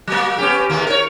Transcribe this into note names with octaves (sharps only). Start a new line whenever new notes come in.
F#3 A#3
B3 C#4 G4
D#2 A#3
A#4 C#5